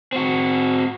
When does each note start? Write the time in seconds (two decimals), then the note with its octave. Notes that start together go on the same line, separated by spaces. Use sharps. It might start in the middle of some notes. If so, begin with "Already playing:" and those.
0.12 C4 F#4